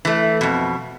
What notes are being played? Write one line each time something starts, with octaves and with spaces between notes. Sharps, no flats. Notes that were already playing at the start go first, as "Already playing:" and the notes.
E3 A3
F2 B2